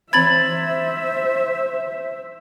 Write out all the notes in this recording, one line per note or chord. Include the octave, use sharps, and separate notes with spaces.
E3 C4 C5 E5 B5 G#6 A6 F#7